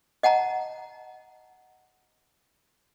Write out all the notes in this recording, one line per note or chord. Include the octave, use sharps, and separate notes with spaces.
D#5 F#5 A5 A#5